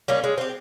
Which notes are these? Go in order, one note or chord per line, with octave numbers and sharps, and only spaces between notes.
G3 A#3 C#4
G#3
C4 G4